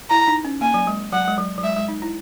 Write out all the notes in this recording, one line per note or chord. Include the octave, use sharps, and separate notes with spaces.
E4 A#5
D#4
C#4
A#3 G#5
F#3
G#3
F#3 F#5
G#3
F#3
F#3
G#3 E5
G#3
D#4
E4